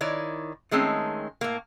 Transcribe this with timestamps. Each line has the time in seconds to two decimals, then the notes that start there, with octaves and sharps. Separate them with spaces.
0.01 D#3 E4 C#5 D5
0.71 D#3 G#3 A3 C4 C#4
1.41 A2 A#3